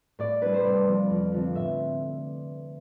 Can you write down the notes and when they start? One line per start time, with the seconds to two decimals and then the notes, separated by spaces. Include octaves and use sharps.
0.19 A2 D5
0.41 G3 D4 B4
0.54 C5
0.64 C3 D5
0.87 F3 B3 D4
1.10 F2
1.32 D3 F3 C4
1.55 A2 E5